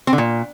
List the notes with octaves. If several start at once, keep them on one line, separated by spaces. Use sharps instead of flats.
C4
D3
A#2